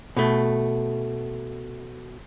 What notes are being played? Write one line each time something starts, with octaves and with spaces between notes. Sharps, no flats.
B2 A3